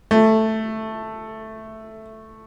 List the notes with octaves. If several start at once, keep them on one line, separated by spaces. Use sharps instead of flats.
A3